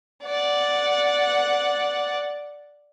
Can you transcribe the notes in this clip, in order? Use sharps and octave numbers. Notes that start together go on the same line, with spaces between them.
D5 F#5